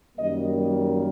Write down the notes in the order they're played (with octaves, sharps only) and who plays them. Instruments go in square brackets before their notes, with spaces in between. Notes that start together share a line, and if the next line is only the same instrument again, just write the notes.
[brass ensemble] F#2 D#3 G3 A#3 D#5